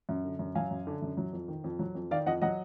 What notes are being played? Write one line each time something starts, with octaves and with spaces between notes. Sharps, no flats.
F#2
D3
F#2
F#3 F5 G#5
F#2
D3
F#2
F#3
F2
D#3
F2
F#3
F2
D#3 D5 F5
F2 D#5 F#5
F#3 D#5 F#5